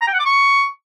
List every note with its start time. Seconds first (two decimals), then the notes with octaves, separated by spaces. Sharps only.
0.02 A#5
0.08 G5
0.13 F#5
0.19 D6
0.25 C#6